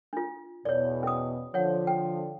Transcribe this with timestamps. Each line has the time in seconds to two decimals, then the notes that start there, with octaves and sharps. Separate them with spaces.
0.13 D4 F4
0.65 E2 B2 C#5 D5
1.03 C#4 D#6
1.54 D3 F3 C#5 F#5
1.87 G5